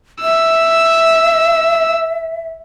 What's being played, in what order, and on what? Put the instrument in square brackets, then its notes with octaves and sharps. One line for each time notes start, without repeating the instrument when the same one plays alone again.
[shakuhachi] E5 [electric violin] E6